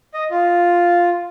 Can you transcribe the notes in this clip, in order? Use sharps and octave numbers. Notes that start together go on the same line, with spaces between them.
D#5
F4